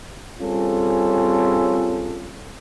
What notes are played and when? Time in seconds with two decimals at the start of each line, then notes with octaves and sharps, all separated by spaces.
0.39 G3 C4 C#4 F4 G#4 A4